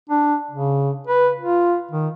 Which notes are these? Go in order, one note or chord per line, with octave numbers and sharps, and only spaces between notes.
D4
C#3
B4
F4
D#3